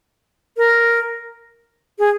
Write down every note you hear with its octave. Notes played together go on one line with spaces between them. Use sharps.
A#4
G#4